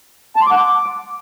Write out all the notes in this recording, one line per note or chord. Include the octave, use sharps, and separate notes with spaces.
A5
C6
D6
F#5
D6